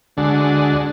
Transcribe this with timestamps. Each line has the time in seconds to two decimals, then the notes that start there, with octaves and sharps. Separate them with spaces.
0.17 D2 D3 G#3 D4 F#4